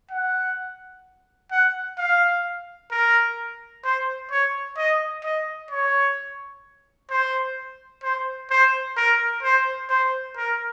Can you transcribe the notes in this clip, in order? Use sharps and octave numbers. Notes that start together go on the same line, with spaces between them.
F#5
F#5
F5
A#4
C5
C#5
D#5
D#5
C#5
C5
C5
C5
A#4
C5
C5
A#4